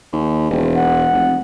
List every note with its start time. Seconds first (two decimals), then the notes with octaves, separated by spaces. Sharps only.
0.13 D#2
0.50 E1
0.76 F#5
1.13 F1